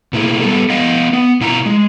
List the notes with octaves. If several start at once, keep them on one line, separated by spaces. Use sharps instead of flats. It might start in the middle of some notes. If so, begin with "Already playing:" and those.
B2 A#3 E4 G#4
G3 B3 A4
B3 D#5 F5
B3
B2 E4 F4 A5 A#5
G#3